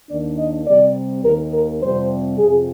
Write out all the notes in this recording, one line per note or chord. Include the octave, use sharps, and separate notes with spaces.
D#2 D#3 A#3 D4 D5
D#5
C3 G3 C4 D5
D#2 D#3 A#3 A#4
A#4
F2 C3 G3 C4 C5
F2 C3 F3 G#4